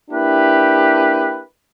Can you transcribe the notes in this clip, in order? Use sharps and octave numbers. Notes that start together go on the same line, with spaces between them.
A#3 D4 E4 G4 B4